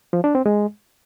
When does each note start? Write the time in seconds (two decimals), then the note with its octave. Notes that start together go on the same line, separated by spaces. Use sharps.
0.13 F3
0.24 D4
0.35 C4
0.46 G#3